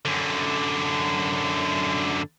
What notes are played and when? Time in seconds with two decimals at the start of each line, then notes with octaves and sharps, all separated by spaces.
0.05 F#2 D3